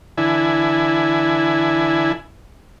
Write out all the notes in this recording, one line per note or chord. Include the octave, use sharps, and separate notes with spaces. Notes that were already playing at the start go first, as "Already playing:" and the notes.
D3 E3 E4 G#5